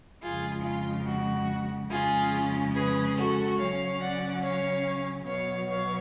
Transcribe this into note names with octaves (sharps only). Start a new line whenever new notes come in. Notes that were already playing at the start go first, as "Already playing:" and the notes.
F2 C#3 G#3 F4 G#4
F4
F#4
F2 C#3 G#3 C#4 F4 G#4
G#4 B4
F#4 A4
C#3 F#3 C#4 C#5 F5
D5 F#5
C#5 F5
B2 F#3 B3 C#5 F5
C#5 F5